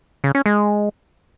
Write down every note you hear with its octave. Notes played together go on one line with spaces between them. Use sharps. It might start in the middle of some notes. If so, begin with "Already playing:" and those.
C#3
C#4
G#3